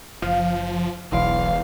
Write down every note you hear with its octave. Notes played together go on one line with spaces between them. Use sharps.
F#1 F3 F5 D#7
E1 B1 E2 F5 C6 D7